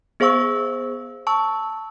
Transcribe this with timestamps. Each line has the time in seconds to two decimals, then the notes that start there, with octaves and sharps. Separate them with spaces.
0.20 B3 G#4 C5 F5 C#6 E6
1.27 A5 C#6 E6